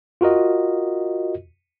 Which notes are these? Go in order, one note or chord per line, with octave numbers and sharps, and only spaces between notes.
F4 F#4 A#4 D#5